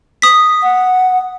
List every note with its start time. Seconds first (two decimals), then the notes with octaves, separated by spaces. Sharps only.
0.22 D#6 B6
0.63 F#5